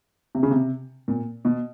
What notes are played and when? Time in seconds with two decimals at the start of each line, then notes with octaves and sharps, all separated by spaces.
0.35 C3
0.43 C#3
0.51 C3
1.08 A#2
1.45 B2